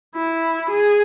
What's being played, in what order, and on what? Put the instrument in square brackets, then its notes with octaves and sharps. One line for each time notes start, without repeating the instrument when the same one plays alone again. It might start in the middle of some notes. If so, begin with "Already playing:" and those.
[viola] E4
G#4